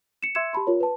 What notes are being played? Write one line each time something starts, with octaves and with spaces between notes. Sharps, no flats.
C#7 E7
E5 C6 E6 G#6 C#7 E7
G4 A5 B5 C6
F4 A#4 C#5
B4 A5